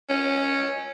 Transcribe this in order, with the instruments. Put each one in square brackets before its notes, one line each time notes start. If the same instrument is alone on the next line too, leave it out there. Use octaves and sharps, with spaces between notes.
[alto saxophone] C#4